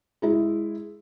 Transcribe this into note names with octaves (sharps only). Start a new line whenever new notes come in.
G#3 E4